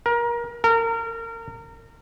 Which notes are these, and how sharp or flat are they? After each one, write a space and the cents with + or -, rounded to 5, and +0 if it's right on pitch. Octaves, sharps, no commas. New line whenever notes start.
A#4 +25
A#4 -30